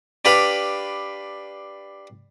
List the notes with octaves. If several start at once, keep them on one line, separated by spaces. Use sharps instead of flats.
D4 G4 B4 F5 B5